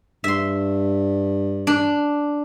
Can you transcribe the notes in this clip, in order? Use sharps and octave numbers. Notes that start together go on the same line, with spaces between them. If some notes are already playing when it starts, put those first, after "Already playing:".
G2 E5 C6
D4